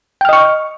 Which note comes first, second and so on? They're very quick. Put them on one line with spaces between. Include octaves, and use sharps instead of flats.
G5 F6 D#5 C#6